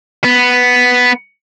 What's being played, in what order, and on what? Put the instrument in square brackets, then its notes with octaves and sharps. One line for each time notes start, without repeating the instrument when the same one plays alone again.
[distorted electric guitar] B3